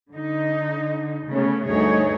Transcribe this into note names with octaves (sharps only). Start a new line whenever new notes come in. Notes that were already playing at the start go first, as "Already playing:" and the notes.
D3 D#4
C#3 A3 B3 C#4
D2 G2 A3 D#4 G#4 C#5